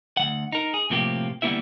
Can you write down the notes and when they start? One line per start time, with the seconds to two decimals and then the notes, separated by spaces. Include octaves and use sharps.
0.17 D2 E3 F#5
0.52 D#4 A#4
0.74 G#4
0.90 A2 C3 F3 A#3 G4
1.42 D2 G3 A#3 B3 E4 E5